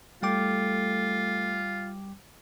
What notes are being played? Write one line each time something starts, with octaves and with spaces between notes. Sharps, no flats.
G3 A3 F4 G5 D6